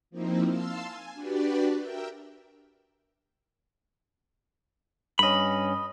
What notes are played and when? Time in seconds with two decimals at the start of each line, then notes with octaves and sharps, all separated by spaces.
0.10 F3 A#3 C4 D#4 E4
0.48 F5 A5 C6 E6
0.83 G#5
1.14 D4 F#4 G4 B4 D5
1.78 A#4 E5 G5
5.19 G2 C#4 D#5 B5